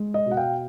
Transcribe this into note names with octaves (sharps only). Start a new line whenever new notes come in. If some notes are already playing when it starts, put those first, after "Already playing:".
Already playing: G#3
D#5
B2
F#5
F5 G5